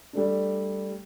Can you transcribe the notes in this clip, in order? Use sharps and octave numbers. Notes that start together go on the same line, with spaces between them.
G3 A3 D4